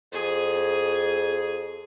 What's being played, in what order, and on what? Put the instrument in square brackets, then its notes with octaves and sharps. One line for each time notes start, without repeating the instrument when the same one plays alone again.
[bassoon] F2 [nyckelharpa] G#4